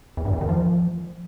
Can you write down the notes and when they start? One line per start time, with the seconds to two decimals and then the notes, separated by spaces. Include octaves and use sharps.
0.17 E2
0.25 G2
0.33 E2
0.41 D#3
0.49 F3